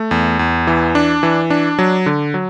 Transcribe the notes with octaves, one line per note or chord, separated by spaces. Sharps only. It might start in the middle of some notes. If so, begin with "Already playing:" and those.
Already playing: A3
E2
E2
E3
D4
E3
D4
F#3
D3
F#3